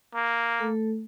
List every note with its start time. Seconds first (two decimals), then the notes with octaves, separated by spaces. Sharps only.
0.14 A#3
0.60 A3 A4